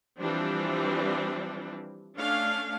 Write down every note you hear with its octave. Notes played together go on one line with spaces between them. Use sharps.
E3 F3 G3 C4 D4
A3 C#4 D4 F5